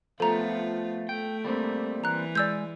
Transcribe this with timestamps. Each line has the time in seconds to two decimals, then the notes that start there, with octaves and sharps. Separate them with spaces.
0.20 F3 A3 B3 F4 A4 A#5
1.09 A3 G5
1.45 G3 A#3 C4
2.04 E3 A#5 F#6
2.35 G#3 D5 E6 G6